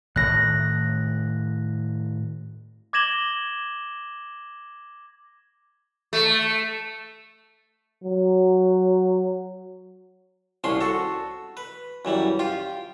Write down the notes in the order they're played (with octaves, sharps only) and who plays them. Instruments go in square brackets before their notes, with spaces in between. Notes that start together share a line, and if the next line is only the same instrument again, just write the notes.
[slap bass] A2 D#3 A3 [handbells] F#6 A#6
[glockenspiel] D6 G#6 A#6 E7 F#7 G7
[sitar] A3
[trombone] F#3
[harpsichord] C2 F3 C#4 C6
F#4 A4
B4
F#2 E3 G3
F4 G4